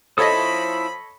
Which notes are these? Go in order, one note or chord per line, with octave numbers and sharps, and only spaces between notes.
F3 E4 A4 C#5 D#5 B5 D#6